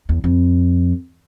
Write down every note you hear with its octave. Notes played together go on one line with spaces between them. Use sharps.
E2
F2